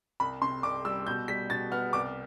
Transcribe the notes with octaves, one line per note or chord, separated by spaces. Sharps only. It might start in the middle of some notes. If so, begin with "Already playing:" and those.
C2 B5
C3 C6
C2 D6
G3 E6
B2 G6
G3 B6
B2 A6
B3 F6
C2 D6